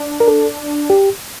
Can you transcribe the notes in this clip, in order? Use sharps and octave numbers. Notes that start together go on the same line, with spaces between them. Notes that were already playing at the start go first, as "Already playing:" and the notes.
Already playing: D4
A#4
A4
G4